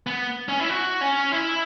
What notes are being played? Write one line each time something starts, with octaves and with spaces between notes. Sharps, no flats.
B3
C#4
E4
F#4
C#4
E4